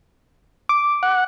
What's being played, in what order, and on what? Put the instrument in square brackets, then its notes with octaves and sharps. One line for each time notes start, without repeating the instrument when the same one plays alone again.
[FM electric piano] D6
[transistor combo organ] F#5